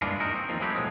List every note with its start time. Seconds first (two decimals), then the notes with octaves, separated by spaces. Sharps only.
0.02 G2 A#2 E3 G#3 D4 F4
0.20 D#4 F#4 A#4
0.34 C4
0.49 D#2 D#3 F3 C4
0.60 F#3 G#3 A3 E4 G4
0.75 B1 A2 F3 G#3